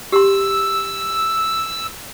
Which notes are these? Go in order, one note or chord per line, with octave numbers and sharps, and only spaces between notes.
G4 C6 E6